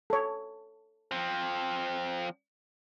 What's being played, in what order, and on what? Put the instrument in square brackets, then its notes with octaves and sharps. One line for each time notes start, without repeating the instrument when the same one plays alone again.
[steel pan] A4 C#5
[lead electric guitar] F3 C4